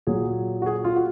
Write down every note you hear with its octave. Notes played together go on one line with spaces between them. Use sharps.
A#2 F#3 G#4
F#4
G#4
F4
F#4